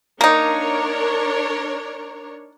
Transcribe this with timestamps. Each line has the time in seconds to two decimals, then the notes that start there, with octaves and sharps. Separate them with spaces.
0.21 A#3 D4 D#4 A#4 C#5